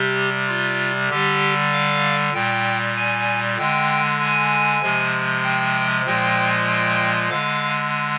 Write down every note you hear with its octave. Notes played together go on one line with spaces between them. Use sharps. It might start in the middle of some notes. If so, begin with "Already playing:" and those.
Already playing: C3 G3 G4
F4
D3 G3 G4
F5
A#2 G3 G5
G#5
D3 G#3 G5
G#5
C3 F3 G#3
G5
A#2 F3 G#3 G5
G5
D3 G#3 F5